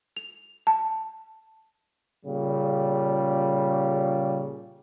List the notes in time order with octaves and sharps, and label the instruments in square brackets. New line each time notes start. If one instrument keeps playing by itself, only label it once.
[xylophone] F7
A5
[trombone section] A#2 C#3 G3